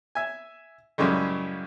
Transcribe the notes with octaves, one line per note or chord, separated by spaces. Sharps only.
E5 G#5
F#2 A2 C#3 G3 G#3